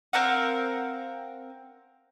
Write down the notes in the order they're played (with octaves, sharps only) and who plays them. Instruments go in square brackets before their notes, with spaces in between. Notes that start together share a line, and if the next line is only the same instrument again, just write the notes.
[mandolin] C4 A#4 F5 F#5